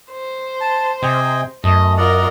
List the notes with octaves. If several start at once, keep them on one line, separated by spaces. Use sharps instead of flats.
C5
A5
C3 D#5 G5 G#5
F#2 A3 D#5
F4 A#4 D5 D#5 F#5